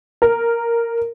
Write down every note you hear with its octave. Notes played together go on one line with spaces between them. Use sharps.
A#4